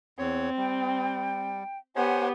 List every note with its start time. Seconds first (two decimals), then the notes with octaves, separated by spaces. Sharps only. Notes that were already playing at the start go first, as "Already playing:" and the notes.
0.19 E2 C4 C#5
0.58 G3 G5
1.96 B3 G4 C5 C#5 F#5 G#5